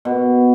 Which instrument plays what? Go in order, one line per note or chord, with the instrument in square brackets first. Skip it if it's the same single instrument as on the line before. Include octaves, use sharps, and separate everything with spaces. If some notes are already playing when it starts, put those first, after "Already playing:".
[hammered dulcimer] B2